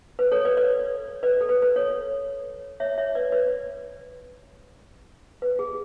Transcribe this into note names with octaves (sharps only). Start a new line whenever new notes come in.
B4
A4 C#5
B4 D5
B4 D5
B4 D5
A4
B4
B4
A4 C#5
C#5 E5
C#5 E5
B4 D5
B4 D5
B4
G#4